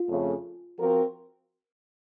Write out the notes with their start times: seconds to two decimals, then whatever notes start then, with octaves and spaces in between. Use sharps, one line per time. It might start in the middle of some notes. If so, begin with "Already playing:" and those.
Already playing: F4
0.09 F2 C#3 A3
0.78 F3 C4 F#4 A#4